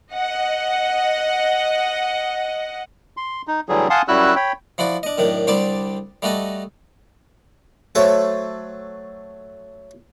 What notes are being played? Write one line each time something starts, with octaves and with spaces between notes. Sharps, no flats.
D#5 F#5
C6
D#4
A2 D3 E3 F#3 G3 G#4
F5 F#5 G#5 A5 C6 D#6
F#2 G3 E4 F#4 E6 F#6
C#5 G5 B5
F3 E4 F#4 D5
D4 D#5
F#2 A2 D#3 D4
C2 D3 G3 C4 D5 A5
G3 A3 F#4 A4 D#5
F#3 A3 A4 C5 C#5